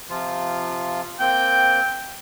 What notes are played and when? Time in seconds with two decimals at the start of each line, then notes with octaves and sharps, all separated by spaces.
0.10 C3 F3 F4
1.20 A#3 C4 G5